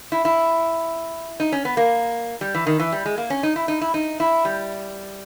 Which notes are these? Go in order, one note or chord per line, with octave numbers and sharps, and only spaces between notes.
E4
E4
D#4
C#4
B3
A#3
G3
E3
D#3
E3
G3
G#3
A#3
C#4
D#4
E4
D#4
E4
D#4
E4
G3